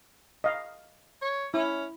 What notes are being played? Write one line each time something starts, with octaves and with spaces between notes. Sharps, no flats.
D#5 F5
C#5
C#4 E4